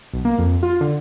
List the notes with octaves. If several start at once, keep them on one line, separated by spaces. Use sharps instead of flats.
B1
A#3
F2
F4
D3